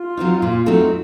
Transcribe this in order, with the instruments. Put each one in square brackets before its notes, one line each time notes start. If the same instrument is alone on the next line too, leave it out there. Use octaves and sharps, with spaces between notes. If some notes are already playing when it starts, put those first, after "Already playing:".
Already playing: [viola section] F4
[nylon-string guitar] F#3 A3 C4 D#4
A#2
F#3 A3 C4 D#4